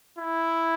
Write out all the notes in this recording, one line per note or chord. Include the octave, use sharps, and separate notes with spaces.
E4